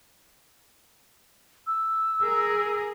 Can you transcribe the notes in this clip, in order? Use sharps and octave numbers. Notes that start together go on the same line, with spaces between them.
E6
G#4 A#4